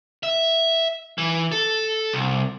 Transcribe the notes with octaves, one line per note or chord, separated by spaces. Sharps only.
E5
E3
A4
C2